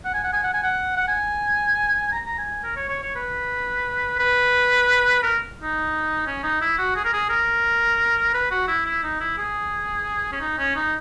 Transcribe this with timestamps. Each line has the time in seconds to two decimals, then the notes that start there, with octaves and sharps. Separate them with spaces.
0.05 F#5
0.14 G#5
0.24 F#5
0.33 G#5
0.43 F#5
0.53 G#5
0.63 F#5
0.97 F#5
1.08 G#5
2.12 A#5
2.26 A#5
2.38 G#5
2.64 A#4
2.76 C#5
2.89 C#5
3.03 C#5
3.16 B4
4.19 B4
5.23 A#4
5.61 D#4
6.26 C#4
6.43 D#4
6.61 E4
6.78 F#4
6.96 G#4
7.04 A#4
7.13 G#4
7.30 A#4
8.34 B4
8.51 F#4
8.68 E4
8.86 E4
9.03 D#4
9.20 E4
9.38 G#4
10.32 C#4
10.41 D#4
10.59 C#4
10.76 D#4